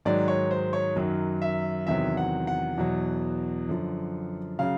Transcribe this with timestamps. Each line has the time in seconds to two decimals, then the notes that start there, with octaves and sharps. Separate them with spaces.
0.05 G#2 D#3 F#3 D5
0.28 C#5
0.51 C5
0.73 C#5
0.96 F#2 D#3 F#3
1.42 E5
1.87 E2 C3 D#3 F#3 E5
2.17 F#5
2.47 F#5
2.77 E2 B2 F#3
3.69 F#2 D3 F3
4.59 C#3 F#3 F5